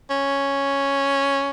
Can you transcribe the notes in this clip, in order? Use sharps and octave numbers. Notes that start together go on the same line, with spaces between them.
C#4